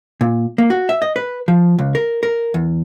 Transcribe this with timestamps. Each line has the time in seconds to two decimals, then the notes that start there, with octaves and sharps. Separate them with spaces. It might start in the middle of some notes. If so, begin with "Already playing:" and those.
0.21 A#2
0.58 A#3
0.70 F#4
0.89 E5
1.02 D#5
1.16 B4
1.48 F3
1.79 C#2
1.95 A#4
2.23 A#4
2.54 E2